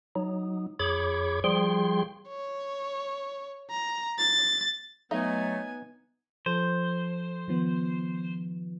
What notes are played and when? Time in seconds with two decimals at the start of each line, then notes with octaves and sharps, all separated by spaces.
0.15 F#3 D#4
0.79 F2 G#4 C#5 B5 D6 G#6
1.44 F3 G3 G#4 G5 C6
2.29 C#5
3.70 A#5
4.18 A6
5.11 F#3 A3 B3 D#4 D#5 E5 G#5
6.46 F3 A4 C5
7.48 D#3 F3 B3